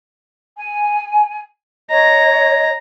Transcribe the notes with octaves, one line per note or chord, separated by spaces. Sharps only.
G#5
C#5 D#5 A#5